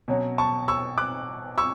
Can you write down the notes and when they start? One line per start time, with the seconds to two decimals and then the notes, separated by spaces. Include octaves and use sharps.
0.08 B2 F#3 C#4
0.38 A5 C#6
0.68 C#6 E6
0.98 D6 F#6
1.58 C#6 E6